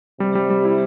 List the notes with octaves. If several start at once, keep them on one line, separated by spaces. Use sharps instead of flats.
C3 G3
G3
G3
E4